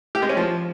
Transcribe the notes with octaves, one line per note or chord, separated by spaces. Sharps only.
G4
G#3
C#4
F3